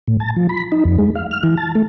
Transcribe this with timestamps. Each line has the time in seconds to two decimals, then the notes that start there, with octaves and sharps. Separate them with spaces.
0.07 A2
0.20 A5
0.36 F3
0.49 B5
0.72 D#4
0.85 F2
0.98 G#3
1.16 F5
1.31 F6
1.43 E3
1.57 A5
1.75 A3